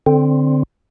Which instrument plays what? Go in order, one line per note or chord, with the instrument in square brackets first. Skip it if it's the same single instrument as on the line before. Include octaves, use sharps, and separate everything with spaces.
[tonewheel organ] D3 C4